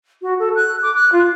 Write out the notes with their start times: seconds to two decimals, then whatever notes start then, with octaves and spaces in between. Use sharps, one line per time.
0.22 F#4
0.39 A4
0.55 F#6
0.82 D6
0.95 F#6
1.12 F4